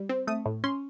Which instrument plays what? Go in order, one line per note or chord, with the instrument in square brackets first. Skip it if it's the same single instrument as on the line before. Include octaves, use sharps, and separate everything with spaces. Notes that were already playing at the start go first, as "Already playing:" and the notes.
Already playing: [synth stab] G3
C4
A3 D#6
A2
C#4 C6